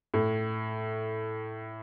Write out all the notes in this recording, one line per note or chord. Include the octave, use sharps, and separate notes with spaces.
A2